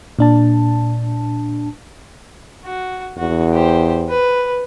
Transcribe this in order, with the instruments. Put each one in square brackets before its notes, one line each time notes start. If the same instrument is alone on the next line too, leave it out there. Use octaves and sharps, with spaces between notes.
[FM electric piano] A#2 D4 A5
[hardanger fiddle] F#4
[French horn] E2 [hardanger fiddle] F#4
[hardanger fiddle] G4 C5
B4